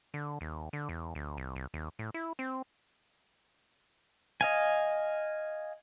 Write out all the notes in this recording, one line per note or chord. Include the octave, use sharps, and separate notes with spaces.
D3
D#2
D3
E2
D2
C2
C2
D#2
A2
E4
C4
D#5 F5 G#5